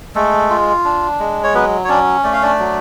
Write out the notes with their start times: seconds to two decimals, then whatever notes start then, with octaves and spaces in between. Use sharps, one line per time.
0.15 G#3 A3 A4
0.50 F4
0.85 D4
1.20 G#3
1.44 C#5
1.54 F#3 B3 B4
1.84 C#5
1.89 C#4 D4 D5
2.24 A3 D5
2.33 F5
2.42 D4 D5
2.59 F#3